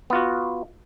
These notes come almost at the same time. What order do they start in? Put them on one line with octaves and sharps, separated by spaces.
B3 F4 F#4